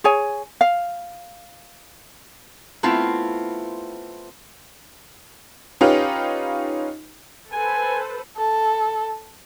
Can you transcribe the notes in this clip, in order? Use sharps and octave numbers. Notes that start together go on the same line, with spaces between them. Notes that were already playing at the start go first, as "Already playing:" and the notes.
G#4 C#5 G#5
F5
A3 B3 C4 E4 F4
C#4 D#4 F4 G4 B4
A4 B4 C5 G#5
A4